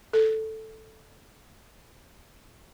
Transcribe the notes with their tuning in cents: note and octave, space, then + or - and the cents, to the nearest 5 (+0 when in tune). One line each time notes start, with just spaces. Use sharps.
A4 +0